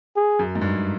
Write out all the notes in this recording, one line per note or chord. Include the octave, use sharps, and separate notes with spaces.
G#4
F#2
G#2
G2